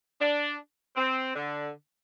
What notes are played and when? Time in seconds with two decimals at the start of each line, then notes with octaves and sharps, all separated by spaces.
0.20 D4
0.96 C4
1.35 D3